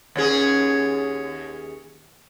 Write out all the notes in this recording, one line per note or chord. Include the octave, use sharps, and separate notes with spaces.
D#2 C#4 G#4